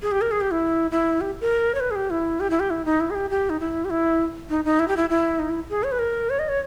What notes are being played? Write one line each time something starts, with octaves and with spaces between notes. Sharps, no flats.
G#4
G4
A#4
G#4
G4
E4
E4
G4
A#4
C#5
B4
G#4
G4
E4
G4
E4
G4
E4
D#4
E4
G#4
G4
G4
D#4
E4
G4
E4
D#4
D#4
E4
G4
E4
E4
D#4
E4
G#4
C#5
B4
A#4
C#5
D#5
C#5